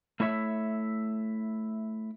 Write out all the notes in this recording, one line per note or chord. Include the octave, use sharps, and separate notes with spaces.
A3 E4 C#5 E5